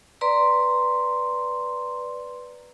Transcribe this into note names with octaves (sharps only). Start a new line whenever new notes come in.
B4 D5 A#5 C6